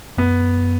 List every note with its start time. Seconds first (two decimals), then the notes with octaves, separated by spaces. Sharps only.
0.17 F#2 B3